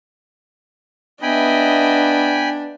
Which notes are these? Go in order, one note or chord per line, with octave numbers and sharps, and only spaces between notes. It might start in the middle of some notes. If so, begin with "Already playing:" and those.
B3 D4 D#5 E5 G5 G#5 B5